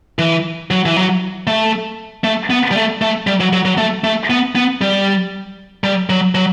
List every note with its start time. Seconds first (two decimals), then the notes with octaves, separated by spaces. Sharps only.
0.19 E3
0.71 F#3
0.86 E3
0.96 F#3
1.47 A3
2.24 A3
2.50 B3
2.71 G3
2.76 A3
3.02 A3
3.27 G3
3.40 F#3
3.53 F#3
3.65 F#3
3.78 A3
4.04 A3
4.30 B3
4.55 B3
4.81 G3
5.84 G3
6.10 F#3
6.35 F#3